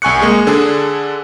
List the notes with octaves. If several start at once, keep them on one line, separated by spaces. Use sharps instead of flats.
C2 G#5 C#6 F#6 C#7
G#3 A#3 G#4
D3 D4 G#4 A4